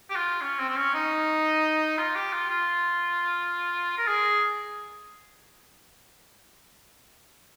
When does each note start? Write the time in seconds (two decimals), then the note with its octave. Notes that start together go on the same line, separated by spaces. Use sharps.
0.10 G4
0.16 F4
0.41 C#4
0.59 C4
0.69 C4
0.77 C#4
0.94 D#4
1.98 F4
2.15 G4
2.33 F4
2.50 F4
3.98 A#4
4.07 G#4